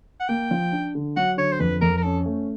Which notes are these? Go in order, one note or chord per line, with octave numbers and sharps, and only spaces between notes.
F#5
A#3 G5
F3
D4
D3
F#3 F#5
D3 C#5
C5
F2 B4
F2 A#4
A#4
C#4 A4
A3